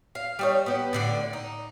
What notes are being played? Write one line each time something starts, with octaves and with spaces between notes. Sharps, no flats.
F5
G3 D#4 C#5
B3 G4
A2 D3 D5
D#4